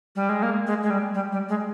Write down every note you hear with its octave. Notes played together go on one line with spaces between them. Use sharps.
G3
G#3
A#3
G#3
G#3
G3
G3
G3
G#3